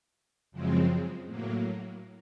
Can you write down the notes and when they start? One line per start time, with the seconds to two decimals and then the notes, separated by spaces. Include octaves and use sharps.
0.52 F#2 C#3 F3 G#3 C4
1.26 A2 F#3 A#3